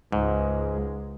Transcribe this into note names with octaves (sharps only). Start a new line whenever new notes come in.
C#2 G#2 G#3